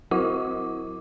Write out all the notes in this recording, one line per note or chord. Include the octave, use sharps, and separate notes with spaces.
F#3 E4 F#4 F#5 D6